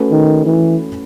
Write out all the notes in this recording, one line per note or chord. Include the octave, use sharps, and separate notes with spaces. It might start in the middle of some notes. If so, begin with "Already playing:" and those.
Already playing: A3 C#4 F#4 B4
D#3
E3